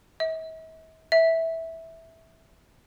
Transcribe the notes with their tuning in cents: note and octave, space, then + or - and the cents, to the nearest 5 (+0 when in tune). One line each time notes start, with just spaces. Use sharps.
E5 -45
E5 -10